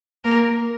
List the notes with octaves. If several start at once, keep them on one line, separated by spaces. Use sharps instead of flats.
A#3 A#4